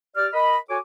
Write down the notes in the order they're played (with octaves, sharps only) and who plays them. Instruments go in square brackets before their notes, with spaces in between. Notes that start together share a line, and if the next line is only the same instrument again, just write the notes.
[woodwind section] G4 D5 F6
A#4 D#5 B5
F#4 A4 C#5 G#5 D6